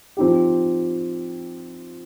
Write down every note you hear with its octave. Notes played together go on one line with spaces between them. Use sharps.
F3 C4 D#4 G4